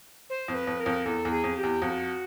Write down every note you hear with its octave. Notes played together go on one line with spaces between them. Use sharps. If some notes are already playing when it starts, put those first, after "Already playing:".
C5
F2
B4
F2
A#4
F2
E2 A4
E2
G#4
F2
G4
E2
F2 F#4